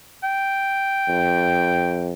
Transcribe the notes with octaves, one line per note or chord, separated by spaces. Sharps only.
G5
F2